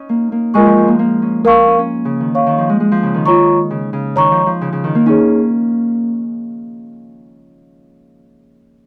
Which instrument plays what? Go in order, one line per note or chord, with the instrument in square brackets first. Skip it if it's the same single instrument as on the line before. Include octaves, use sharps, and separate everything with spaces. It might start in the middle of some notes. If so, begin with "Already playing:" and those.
Already playing: [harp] C#4 D#4
A#3
A#3
[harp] G#3 [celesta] F4 A#4 D#5 G#5 C#6
[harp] F3
F3
A#3
A#3
C#4
[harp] A#3 [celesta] A#4 F5 C#6
[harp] C#4
C#4
C#3
D#3
[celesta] C#5 F5 C#6
[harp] D#3
F3
G#3
G#3
F3
C#3
D#3
[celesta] F4 C#5 A#5 C#6
[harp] C#3
C#3
[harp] D#3 [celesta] C#5 A#5 C#6
[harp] F3
F3
C#3
C#3
D#3
A#3
[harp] C#4 [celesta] D#4 G#4 C#5